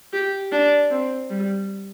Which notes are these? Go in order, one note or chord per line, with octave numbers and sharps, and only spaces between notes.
G4
D4
C4
G3